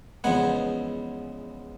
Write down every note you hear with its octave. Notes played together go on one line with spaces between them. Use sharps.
E2 C#3 F3 G#3 B3 F#5 G#5